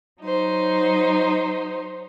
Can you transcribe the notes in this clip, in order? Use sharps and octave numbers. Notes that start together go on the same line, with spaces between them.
F#3 D#4 C5